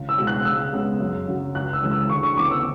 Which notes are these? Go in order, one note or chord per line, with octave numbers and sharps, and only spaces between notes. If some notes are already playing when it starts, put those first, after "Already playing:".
Already playing: C#2
E6
B2 G#3 B3
F#6
C#2 E6
C#3 G#3 B3
F#2
C#3 F#3
C#2 F#6
E6
C#3 E3 G#3
E6
D2 C#6
C#6
C#3 E3 B3 D6
E6